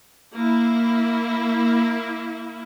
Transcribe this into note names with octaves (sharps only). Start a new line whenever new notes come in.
A#3 E4